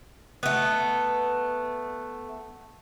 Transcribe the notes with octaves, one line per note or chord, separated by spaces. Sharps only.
A3 B3